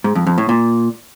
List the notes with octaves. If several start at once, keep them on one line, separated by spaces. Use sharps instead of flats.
G#2
F2
F2
A2
A#2